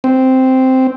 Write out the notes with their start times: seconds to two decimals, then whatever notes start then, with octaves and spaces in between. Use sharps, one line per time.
0.04 C4